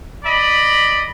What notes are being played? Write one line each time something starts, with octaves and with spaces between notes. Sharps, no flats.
D5 D#5 B5